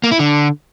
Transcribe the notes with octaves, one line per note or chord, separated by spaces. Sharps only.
A#3
E4
D3